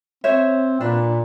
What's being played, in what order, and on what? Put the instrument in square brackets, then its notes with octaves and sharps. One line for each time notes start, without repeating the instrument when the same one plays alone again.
[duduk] C4 [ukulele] C5 C#5 E5
[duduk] A#2 [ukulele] D4 B4